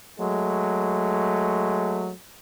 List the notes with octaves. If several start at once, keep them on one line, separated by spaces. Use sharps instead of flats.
F#3 G#3 A3